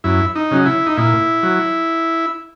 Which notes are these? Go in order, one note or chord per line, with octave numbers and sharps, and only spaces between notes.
F#2 E4
D#4
C#3 F#3
E4
D#4
A#2 E4
F#3